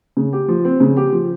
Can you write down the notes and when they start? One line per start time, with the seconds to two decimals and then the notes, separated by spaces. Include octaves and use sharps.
0.17 C#3
0.33 G4
0.48 F3
0.65 C4
0.80 C#3
0.97 G4
1.13 F3